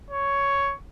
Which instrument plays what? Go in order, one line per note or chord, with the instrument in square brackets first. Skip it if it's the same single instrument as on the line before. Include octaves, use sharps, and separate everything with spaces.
[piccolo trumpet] C#5